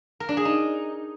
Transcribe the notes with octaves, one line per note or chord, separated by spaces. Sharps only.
A#4
D4
G#4
D#4